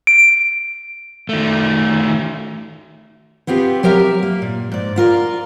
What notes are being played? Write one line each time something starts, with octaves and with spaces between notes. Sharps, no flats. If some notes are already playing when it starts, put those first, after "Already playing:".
D7
D#3 A3
B3 C4 F4 G4 G#4
F#3 G4 A#4 E5 A#5
A#3
A#2
G#2 D5
E4 F4 A#4 D5